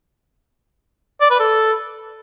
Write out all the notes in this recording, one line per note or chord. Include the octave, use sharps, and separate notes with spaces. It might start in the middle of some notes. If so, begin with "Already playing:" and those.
D5
B4
A4